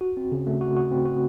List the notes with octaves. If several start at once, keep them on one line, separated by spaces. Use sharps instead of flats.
F#4
C4
C#3
A3
F#4
F#4
C4
F#4